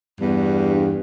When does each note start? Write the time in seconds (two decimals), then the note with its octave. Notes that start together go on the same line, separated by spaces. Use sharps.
0.20 E2 G2